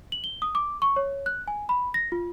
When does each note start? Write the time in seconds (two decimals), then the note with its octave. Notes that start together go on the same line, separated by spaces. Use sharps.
0.12 F#7
0.24 G7
0.42 D#6
0.55 D6
0.82 C#6
0.96 C#5
1.26 F#6
1.48 G#5
1.69 B5
1.94 A#6
2.12 F4